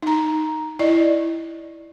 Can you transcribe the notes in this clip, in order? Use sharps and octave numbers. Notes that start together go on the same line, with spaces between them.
D#4 A#5
E4 D5 D#5